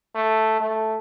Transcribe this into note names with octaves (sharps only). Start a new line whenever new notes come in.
A3
A3